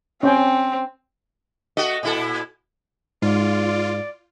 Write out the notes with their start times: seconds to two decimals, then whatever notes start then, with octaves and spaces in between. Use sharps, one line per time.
0.23 C4 C#4 G5 G#5
1.77 A3 F#4 D#5
2.03 A#2 E4 A4
3.22 G#2 F4 D5